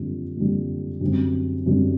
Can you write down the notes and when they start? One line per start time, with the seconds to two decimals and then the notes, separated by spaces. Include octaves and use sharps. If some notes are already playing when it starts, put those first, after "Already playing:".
Already playing: F#1 F2 D3 G3
0.36 F#1 F2 D3 G3
1.01 F#2 D3 G3 C4
1.66 F#2 D3 G3 C4